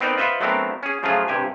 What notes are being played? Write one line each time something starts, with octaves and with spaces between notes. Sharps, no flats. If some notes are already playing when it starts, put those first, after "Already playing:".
B3 C4 D#4 A#4 C5 D5
F4 B4 C5 D#5 E5 F#5
F#3 A3 B3 C4 D4 A#4
C#4 G#4
C#3 F3 F#3 A3 F4 G#4
G2 C3 G4 G#5